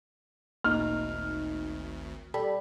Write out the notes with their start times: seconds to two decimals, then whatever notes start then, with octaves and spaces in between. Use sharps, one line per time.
0.64 G#1 D2 A#2 D#4 F6
2.34 G3 G4 A4 B5